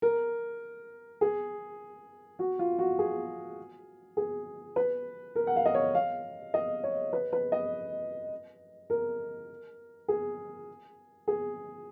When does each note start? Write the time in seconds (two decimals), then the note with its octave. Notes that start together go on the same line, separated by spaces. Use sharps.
0.02 A#4
1.21 G#4
2.39 F#4
2.59 F4
2.79 F#4
2.99 G#4
4.17 G#4
4.76 B4
5.36 A#4
5.47 F#5
5.56 F5
5.66 D#5
5.74 C#5
5.95 F5
6.54 D#5
6.83 C#5
7.13 B4
7.33 B4
7.52 D#5
8.90 A#4
10.08 G#4
11.28 G#4